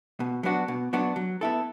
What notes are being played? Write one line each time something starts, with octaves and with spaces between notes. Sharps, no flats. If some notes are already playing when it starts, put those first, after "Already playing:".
B2
F#3 B3 D4 F#4
B2
F#3 B3 D4 F#4
F#3
B3 E4 A4